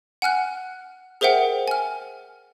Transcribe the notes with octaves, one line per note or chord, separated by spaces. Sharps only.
F#5 G#5 F6 F#6
G#4 A#4 C5 E5 F#5 G5
G#5 F6